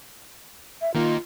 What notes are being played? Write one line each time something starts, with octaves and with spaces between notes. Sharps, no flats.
E5
D#3 A#3 D#4 F4